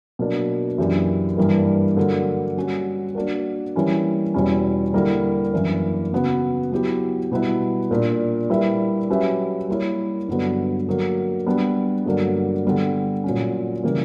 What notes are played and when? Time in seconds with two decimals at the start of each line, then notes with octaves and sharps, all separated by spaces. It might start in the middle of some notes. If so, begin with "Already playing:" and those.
0.19 B2 F#3 A#3 D4
0.78 F#2 E3 A#3 D4 G4
1.37 G2 E3 G3 A#3
1.97 D3 F#3 A#3
2.57 G3 C#4 F#4
3.15 A#3 D4 F#4 A#4
3.76 E3 G3 A#3 C#4 E4
4.34 E2 B2 G3 C#4 E4
4.93 D3 G3 A#3 E4 A#4
5.53 F#2 E3 A#3 D4
6.13 C#3 F#3 B3 F#4 B4
6.72 F#3 B3 E4 G4
7.32 B2 G3 B3 E4 B4
7.91 A#2 A#3 D4
8.50 G3 A#3 E4 B4 E5
9.09 F#3 C#4 G4 B4 E5
9.68 G3 A#3 E4 A#4 C#5
10.28 G2 D3 F#3 B3
10.88 D3 F#3 A#3
11.46 G3 B3 D4
12.05 G2 D3 F#3 A#3 D4
12.65 D3 G3 B3
13.24 A#2 F#3 C#4
13.84 C#3 E3 G3 A#3